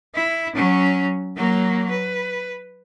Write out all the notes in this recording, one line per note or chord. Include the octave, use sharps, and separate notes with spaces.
E4
F#3 C#4
F#3 A#3
B4